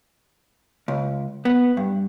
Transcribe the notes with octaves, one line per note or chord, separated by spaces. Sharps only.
C#2
B3
G2